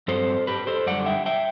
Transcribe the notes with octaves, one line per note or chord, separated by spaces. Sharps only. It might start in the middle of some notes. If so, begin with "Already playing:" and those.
G2 F#3 C4 A4 C5
G4 B4
A4 C5
F#2 D3 G3 D5 F#5
E5 G5
E5 G5